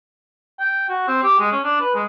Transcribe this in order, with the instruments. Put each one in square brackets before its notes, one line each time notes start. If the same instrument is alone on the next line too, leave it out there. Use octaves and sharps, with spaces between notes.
[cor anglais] G5
F#4
C4
G4
G#3
C#4
D4
B4
G#3